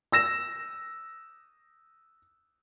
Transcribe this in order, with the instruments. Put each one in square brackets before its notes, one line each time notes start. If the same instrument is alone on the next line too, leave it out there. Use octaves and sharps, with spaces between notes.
[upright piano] E6 A#6 E7